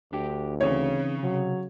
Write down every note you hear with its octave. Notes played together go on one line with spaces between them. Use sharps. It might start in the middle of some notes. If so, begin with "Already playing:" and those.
D2 D4 G4 G5
C#3 E3 C4 D#4 C#5
C3 F#3